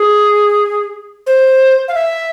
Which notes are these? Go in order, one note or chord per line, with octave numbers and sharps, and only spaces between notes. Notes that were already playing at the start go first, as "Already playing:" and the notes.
Already playing: G#4
C5
F5
E5